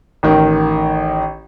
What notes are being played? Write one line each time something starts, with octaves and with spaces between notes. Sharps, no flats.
A1 D#3